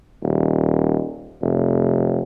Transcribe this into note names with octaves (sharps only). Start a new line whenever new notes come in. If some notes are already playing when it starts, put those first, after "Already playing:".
D#1
F1